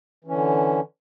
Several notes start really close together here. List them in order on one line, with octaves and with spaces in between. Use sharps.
E3 C#4 D3